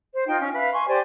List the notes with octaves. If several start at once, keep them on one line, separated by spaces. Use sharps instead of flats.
C5
D#4 F4 G5
C#4
B4 E5 F5
G#5 C6 C#6
G4 C5 D5 G#5